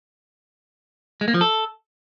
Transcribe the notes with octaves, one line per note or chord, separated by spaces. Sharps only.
G#3
A#3
F3
A4